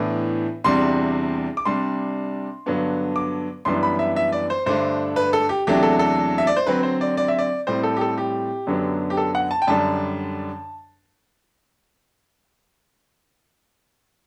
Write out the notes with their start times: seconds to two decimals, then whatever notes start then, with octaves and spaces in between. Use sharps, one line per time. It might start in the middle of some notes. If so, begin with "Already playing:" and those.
Already playing: A2 E3 B3 D4
0.64 E2 C3 G3 D4 C6
1.57 D6
1.65 C3 G3 D4 C6
2.66 G2 D3 F#3 B3 D4
3.16 D6
3.65 F#2 E3 G3 B3 D4 C6
3.83 B5
3.99 E5
4.16 E5
4.32 D5
4.50 C5
4.66 G2 D3 A3 D4 C5
5.16 B4
5.33 A4
5.49 G4
5.67 E2 C3 F#3 A3 D4 G4
5.83 A4
5.99 A4
6.38 E5
6.47 D5
6.57 C5
6.67 D3 F#3 C4 B4
6.83 C5
7.01 D5
7.17 D5
7.28 E5
7.39 D5
7.67 A2 G3 C4 C5
7.83 A4
7.97 G4
8.01 A4
8.18 G4
8.67 F#2 D3 F#3 B3 D4
9.10 G4
9.17 A4
9.35 F#5
9.51 A5
9.62 G5
9.67 F#2 D3 G3 D4 A5